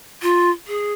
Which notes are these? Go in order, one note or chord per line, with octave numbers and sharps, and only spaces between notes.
F4
G#4